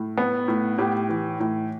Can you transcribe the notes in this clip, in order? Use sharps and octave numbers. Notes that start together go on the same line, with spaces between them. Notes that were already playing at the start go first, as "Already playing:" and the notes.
Already playing: A2
B3
A2
A2 G4
E3
A2